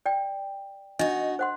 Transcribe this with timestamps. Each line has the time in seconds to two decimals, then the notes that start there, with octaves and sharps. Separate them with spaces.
0.06 D5 G5
0.99 D4 D#4 F#4 D#5
1.39 C5 F#5 C6